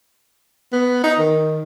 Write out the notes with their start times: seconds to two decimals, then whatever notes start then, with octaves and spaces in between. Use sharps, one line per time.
0.72 B3
1.04 D#4
1.19 D#3